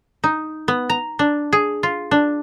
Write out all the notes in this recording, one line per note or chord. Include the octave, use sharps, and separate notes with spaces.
D#4
B3
A#5
D4
G#4
F4
D4